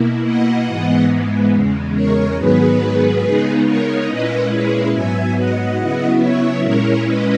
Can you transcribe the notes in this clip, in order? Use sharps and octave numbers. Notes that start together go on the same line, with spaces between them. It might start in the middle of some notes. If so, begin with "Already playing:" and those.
Already playing: B2 A#3 E4
D#5 F#5
G#2 E3 G#3 B3
E2 C#3 G#3
A#4 C#5
G#2 D#3 F#3 B3 G#4 B4
C#3 G#3 B3 D#4
A#4 C#5
A#2 G#3 C#4 E4 B4 D#5
G#4 B4
G#2 F#3 B3 E5 G#5
D#5 F#5
C#3 F#3 B3 E4
C#5 E5
A#2 G#3 C#4 E4 A#4 C#5
B4 D#5